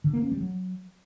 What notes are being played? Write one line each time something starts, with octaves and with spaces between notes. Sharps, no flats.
D3
A#3
C#4
G3
F#3